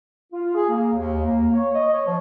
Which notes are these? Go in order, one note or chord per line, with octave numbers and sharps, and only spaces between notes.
F4
G#4
A#3
D#2
A#3
C#5
D#5
C#5
F3